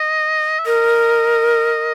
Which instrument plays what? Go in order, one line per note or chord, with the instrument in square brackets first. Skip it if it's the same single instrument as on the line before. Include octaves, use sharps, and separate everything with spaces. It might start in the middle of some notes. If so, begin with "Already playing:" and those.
Already playing: [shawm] D#5
E5
[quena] A#4 [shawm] D#5